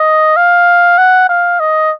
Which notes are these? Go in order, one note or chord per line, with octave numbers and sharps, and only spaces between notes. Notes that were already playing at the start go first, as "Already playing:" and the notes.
Already playing: D#5
F5
F#5
F5
D#5